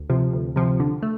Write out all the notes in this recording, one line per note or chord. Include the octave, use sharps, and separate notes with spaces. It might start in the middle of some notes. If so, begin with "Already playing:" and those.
Already playing: D2
C3 F3
D2
C3 F3
D3
A3